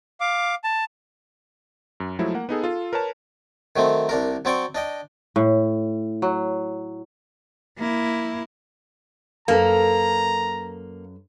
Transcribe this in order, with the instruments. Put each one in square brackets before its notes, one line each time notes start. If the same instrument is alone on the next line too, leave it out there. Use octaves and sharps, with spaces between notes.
[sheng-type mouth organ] F5 D6
A5
[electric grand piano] F#2
F3 F#3 G#3 A3 E4
A#3 F#5
B3 D#4 G#4 A4
F4 A4
A#4 B4 C#5 A5
[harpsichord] D#3 F#3 A3 C4
C2 D4 A#4
F#3 C4 D5 G5 C#6
D4 D#5 G5
[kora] A2
F#3
[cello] A#3 E4
[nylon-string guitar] F#2 A4 B4 [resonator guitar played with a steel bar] A#3 [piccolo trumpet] A#5